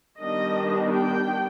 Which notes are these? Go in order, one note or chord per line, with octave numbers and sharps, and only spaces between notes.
D#3 G3 B3 D4 D#5
G5